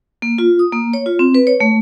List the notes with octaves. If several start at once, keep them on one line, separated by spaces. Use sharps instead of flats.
A#3
F4
D#6
A#3
C#5
F4
C4
B4
C#5
A3